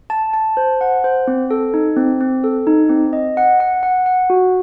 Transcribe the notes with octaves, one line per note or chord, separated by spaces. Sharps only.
A5
A5
C5
F#5
C5
C4
A4
D#4
C4
C4
A4
D#4
C4
D#5
F#5
F#5
F#5
F#5
F#4